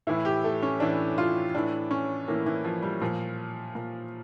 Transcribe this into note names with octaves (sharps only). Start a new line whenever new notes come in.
A2 E3 E4
G4
A3
C#4
A2 E3 D4
F4
A2 E3 D4
C#4
A2 E3 A#3
E3
F3
G3
A#2 F3
A#2